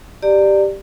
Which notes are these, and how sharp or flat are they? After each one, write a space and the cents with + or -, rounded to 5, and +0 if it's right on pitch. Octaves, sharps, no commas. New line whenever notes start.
G4 +0 D5 +15 A#5 -30